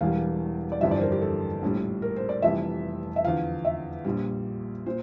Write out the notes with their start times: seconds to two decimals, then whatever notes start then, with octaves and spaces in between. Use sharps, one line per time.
0.01 E1 E2 E3 G3 F5
0.72 D5
0.81 G1 F2 E3 G3 E5
0.91 D5
0.97 C5
1.01 A#4
1.12 G4
1.22 A4
1.62 A#1 A2 G3
2.02 A#4
2.16 C5
2.29 D5
2.42 F1 F2 E3 G3 E5
3.16 E5
3.24 E2 D3 F3 F5
3.65 E5
4.05 A#1 A#2 G3
4.86 A#2 C5